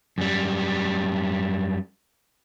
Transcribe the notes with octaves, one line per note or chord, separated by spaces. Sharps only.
F#2 G3